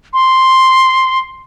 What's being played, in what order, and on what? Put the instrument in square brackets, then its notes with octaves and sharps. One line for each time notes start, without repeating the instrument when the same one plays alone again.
[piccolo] C6